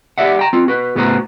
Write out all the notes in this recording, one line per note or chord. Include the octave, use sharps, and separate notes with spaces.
G4 A#4 D5 E5 F#5
G5 A#5
C4 F4
F#4 B4
C#2 A2 B3 F#4 C5 A#5